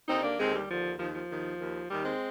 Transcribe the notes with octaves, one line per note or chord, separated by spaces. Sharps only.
D#2 D3 C4 D#4
A#3 D4
D#2 D3 G#3 C4
G3
D#2 D3 F3
D#2 D#3 F3
F3
D#2 D#3
D#2 D#3
D#2 D#3 G3
G#3 C4